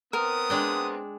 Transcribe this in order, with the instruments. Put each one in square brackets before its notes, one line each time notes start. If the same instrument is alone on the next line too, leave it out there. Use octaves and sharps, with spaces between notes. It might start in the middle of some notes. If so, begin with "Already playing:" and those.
[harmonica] B3 C4 [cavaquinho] A#4 [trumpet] D#6
[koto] G#3 D4 G5